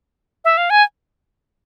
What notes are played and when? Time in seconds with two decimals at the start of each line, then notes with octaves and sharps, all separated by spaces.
0.45 E5
0.57 F5
0.70 G#5